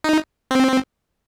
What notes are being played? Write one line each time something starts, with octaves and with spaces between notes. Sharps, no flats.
D#4
C4